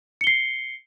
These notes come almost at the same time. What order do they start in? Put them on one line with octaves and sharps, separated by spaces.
C#7 G7 C7